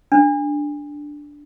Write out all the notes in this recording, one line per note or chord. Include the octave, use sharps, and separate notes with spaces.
D4